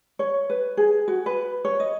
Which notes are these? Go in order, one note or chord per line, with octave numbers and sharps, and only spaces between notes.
C#5
B4
G#4
F#4
B4
C#5
D#5